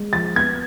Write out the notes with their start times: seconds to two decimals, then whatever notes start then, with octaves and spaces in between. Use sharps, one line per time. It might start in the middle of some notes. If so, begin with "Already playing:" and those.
Already playing: G#3
0.13 F3 A6
0.36 B3 G#6